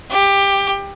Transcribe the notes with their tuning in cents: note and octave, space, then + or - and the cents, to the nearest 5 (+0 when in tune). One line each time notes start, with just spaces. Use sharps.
G4 +15